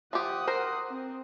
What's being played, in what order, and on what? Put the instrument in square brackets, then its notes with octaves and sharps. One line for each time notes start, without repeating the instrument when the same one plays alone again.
[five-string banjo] F3 G4 [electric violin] F#5 D#6
[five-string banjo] A#4 C5
[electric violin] C4